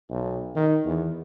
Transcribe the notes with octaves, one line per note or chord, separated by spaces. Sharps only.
B1
D#3
E2